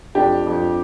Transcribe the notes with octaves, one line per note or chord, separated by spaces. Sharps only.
F2 D4 G4
F2